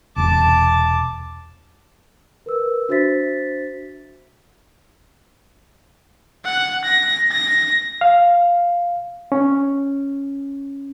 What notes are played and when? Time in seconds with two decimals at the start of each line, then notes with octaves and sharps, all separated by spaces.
0.16 E1 C2 A5 D6
2.46 A#4 B4 E6
2.89 D4 F#4 C5 E5 A6 B6
6.45 F#5
6.85 A#6
7.32 A#6
8.01 F5
9.32 C#4